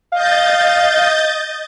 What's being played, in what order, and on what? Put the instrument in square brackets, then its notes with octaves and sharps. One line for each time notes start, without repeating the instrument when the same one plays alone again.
[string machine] D#5 G6 A6 [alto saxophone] F5